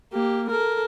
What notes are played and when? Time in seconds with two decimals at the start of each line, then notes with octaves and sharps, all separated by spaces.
0.13 A#3 G4
0.50 A4 A#4